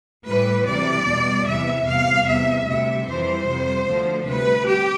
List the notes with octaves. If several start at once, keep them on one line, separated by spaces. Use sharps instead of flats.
A2 E3 G3 B4
D2 C3 E3 G3 D5
E2 B2 G3
E2 C3 E3 E5
E2 C3 G3 F5
E2 C3 G3 E5
D2 C3 G3 E5
F2 E3 G3 C5
F2 C3 G3
D2 D3 F3
D2 C3 G3 B4
G4